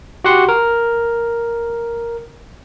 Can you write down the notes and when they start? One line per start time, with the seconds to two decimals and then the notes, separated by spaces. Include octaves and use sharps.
0.24 F#4 G4 F#5 C6
0.49 A#4